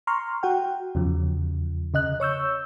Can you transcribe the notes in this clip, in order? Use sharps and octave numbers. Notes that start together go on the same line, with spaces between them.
A#5 C6 C#6 F6
F#4 F#5 G5
E2 C#3 F3
C#3 D#5 F#6
C#5 C#6 E6 G6